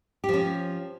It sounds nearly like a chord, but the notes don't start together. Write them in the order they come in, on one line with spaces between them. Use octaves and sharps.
G4 F3 C#4